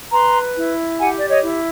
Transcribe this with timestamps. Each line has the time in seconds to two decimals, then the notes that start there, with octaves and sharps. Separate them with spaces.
0.12 B4 A#5 C6
0.55 E4
0.99 G4 F#5 G#5
1.19 D5
1.28 C#5 D#5
1.43 E4